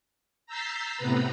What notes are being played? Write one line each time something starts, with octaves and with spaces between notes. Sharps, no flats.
A#5 E6 G6 A6 B6 C7
A2 C3 B3 B4 A#5 B5